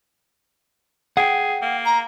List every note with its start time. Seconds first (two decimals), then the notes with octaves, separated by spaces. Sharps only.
1.17 G#4 F#5 G5
1.62 A#3
1.86 A#5